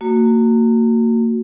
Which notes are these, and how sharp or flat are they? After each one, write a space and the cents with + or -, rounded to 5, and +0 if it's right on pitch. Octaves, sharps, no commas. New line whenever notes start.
A#3 -30 F#4 +0